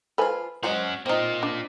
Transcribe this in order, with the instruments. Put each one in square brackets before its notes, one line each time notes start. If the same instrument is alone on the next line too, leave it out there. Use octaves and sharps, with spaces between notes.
[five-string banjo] F3 F4 [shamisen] A4 B4 G#5
[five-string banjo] G#3 F#4 C5 [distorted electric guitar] C#4 F#5
[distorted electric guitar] A#3 F4 [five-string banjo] C4 D#4
[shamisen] D4